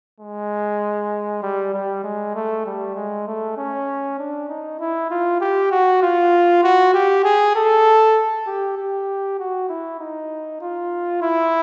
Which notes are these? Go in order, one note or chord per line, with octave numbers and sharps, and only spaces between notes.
G#3
G3
G3
G#3
A3
G3
G#3
A3
C#4
D4
D#4
E4
F4
G4
F#4
F4
F#4
G4
G#4
A4
G4
G4
F#4
E4
D#4
F4
E4